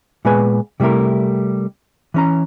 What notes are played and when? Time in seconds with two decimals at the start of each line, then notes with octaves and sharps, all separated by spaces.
0.25 A#2 G#3 B3 B4 G#5
0.80 C3 G3 A3 E4 A#4
2.14 E3 C#4 A#5